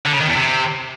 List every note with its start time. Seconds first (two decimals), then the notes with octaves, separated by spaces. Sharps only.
0.06 D3
0.13 C#3
0.21 D#3
0.28 E2
0.35 C3